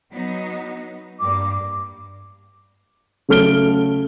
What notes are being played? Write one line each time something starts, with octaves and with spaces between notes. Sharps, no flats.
F#3 B3 D#4
G2 G3 A#3 D6
C#3 F#3 A3 F6 D7 G7